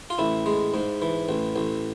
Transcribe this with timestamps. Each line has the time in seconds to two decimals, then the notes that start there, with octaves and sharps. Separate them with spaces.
0.10 F4
0.18 A1 E4
0.46 G#3
0.74 G#2
1.02 E3
1.29 A1
1.56 A1